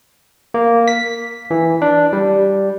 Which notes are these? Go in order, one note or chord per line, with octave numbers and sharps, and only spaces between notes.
A#3
B6
E3
D4
G3